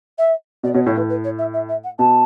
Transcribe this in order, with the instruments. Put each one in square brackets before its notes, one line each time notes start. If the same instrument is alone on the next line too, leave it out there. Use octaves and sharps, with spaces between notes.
[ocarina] E5
[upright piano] B2 [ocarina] D5
[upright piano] B2 [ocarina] C#5
[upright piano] A2 [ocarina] C#5
[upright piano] A2 [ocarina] B4
[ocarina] B4
C#5
E5
E5
E5
F#5
[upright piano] B2 [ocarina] A5